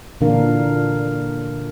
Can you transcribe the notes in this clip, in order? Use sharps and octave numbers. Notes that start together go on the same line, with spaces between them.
A#2 D3 E3 D4 A#4 F5